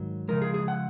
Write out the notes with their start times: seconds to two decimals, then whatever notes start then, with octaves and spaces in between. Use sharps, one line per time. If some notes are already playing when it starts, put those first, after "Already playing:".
Already playing: G#2 D#3 F#3
0.28 C#3 F3 G#3 A#4
0.42 G#4
0.54 G#4
0.68 F#5